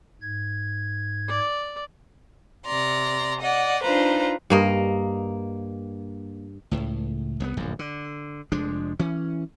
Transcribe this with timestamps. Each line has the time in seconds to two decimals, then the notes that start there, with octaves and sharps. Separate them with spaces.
0.21 G#2 G#6
1.28 D5
2.65 C3 D5 A#5 C6
3.41 D5 D#5 F#5
3.83 D4 D#4 F4 B4 C5 A#5
4.50 G2 A#3 D#5
6.71 C#2 A2
7.40 C2 A#3 B3
7.57 D1 A#1 F#2
7.79 D3
8.52 F1 F3 G#3 D4
8.99 E3 C#4